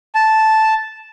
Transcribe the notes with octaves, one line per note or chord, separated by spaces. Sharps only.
A5